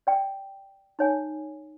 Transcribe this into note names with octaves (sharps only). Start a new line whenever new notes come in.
D5 G5
D#4 C#5 G#5